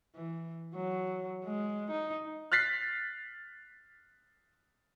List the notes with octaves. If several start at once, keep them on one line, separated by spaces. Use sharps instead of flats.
E3
F#3
G#3
D#4
F6 F#6 A6 B6 C7